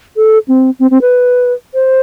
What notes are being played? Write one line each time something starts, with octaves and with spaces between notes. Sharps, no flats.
A4
C4
C4
C4
B4
C5